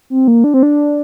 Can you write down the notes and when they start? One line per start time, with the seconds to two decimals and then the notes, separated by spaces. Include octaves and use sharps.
0.10 C4
0.28 A#3
0.44 D4
0.54 C4
0.63 D4